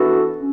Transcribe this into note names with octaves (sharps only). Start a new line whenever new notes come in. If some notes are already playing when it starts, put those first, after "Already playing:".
Already playing: E3 B3 D4 F#4 A4
C#4